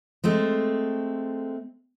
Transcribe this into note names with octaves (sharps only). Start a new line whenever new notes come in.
G#3 A3 C4